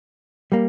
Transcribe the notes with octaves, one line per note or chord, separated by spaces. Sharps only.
G3 A#3